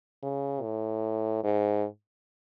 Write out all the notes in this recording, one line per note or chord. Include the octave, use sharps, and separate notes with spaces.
C#3
A2
G#2